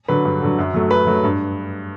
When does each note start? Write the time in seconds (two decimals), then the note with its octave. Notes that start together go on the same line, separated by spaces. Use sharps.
0.08 D3 F#3 B4
0.25 G2
0.42 D3 F#3
0.58 F#2
0.74 F#3 A3
0.90 F#2 B4
1.07 F#3 A3
1.24 G2